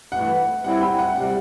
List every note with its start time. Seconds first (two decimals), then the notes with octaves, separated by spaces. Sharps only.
0.12 G2 E3 A3 F#5
0.64 G3 C4 E4 F#5
0.81 G5
0.99 F#5
1.16 C3 G3 F#5